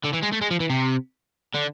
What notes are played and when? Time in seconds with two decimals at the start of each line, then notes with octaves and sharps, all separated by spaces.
0.04 D3
0.13 E3
0.22 G#3
0.32 A3
0.41 G#3
0.51 F3
0.60 E3
0.70 C3
1.55 D3